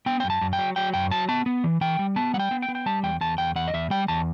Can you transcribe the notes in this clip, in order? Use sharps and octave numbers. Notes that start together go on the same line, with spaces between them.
B3 G5
F#2 G5
A5
F#2
G5
F#3
F#3 G5
F#2 G5
F#3 A5
B3 A5
B3
E3
E3 G5
G3
B3 A5
G3 F#5
G5
B3
G5
B3
G5
G3 A5
E2 G5
E2 A5
E2 G5
E2 F#5
D#5
E2 E5
G3 G5
E2 A5